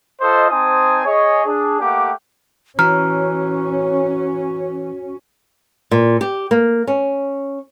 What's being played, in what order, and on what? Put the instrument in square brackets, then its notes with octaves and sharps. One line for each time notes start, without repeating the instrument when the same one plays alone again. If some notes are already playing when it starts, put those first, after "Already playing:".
[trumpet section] F4 A4 C5 D#5
C4 D#4 C5 G#5 A5 D#6
G#4 C#5 D#5
D4 G#4
A3 A#3 G4 F#5 G5 D6
[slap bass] E3 [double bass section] C#4 [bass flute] F#4 [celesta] A#5 F6
[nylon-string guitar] A#2
G4
A#3
C#4